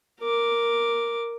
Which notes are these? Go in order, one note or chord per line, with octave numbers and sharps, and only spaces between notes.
A#4 D6